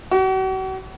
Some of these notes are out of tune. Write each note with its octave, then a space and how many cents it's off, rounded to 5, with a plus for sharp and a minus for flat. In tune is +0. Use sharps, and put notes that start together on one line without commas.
F#4 +40